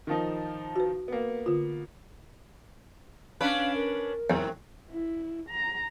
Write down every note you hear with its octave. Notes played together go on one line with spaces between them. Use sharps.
D#3 F3 D#4
F#4 B4
A#3 B3
D3 F4
C#4 D4 B4 F5
A#4
E2 G#2 C3 F#3
E4
A#5